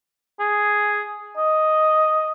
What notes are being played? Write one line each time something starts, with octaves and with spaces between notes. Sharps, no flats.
G#4
D#5